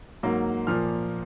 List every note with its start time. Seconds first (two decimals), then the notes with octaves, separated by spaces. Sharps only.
0.23 G#2 F#3 A#3
0.67 A#2 F3 A#3 F6